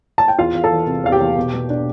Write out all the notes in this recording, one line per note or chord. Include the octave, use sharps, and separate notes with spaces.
A5
G5
E2 F4 F5
E2
A4 A5
E3
C3
E2 F5
G4 G5
E2
B2
B2
D4